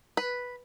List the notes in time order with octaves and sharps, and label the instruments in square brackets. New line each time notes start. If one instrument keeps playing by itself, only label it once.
[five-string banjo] B4